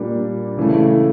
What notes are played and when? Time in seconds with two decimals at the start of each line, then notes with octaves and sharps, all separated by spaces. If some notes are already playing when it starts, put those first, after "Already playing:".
Already playing: A#2 G3 A#3 D4
0.57 C#3 E3 A3